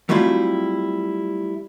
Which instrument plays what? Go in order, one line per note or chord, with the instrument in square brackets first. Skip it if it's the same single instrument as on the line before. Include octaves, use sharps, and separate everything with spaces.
[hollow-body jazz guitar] F#3 G3 A3 C4 E4 F4